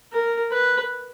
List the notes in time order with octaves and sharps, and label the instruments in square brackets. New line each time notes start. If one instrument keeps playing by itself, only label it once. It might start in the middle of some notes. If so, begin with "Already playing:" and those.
[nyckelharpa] A#4
B4